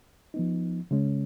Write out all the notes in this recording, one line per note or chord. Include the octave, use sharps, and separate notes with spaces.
F3 B3 D#4
C#3 G#3 C#4